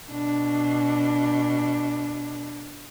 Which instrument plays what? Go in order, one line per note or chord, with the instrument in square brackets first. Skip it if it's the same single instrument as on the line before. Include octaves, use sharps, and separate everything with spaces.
[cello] B2 D4